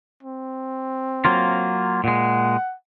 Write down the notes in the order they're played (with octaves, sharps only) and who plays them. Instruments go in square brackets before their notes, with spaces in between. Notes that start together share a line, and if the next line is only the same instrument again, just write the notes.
[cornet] C4
[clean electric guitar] F#3 A#3 F4
[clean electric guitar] A#2 G#3 [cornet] F#5